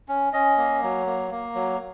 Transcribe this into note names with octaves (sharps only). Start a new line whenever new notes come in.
C#4
C#4 D#5
A#3
F#3
A#3
A#3
F#3